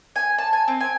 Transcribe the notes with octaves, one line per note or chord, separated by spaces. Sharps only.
G#5
A5
G#5
C4
G#5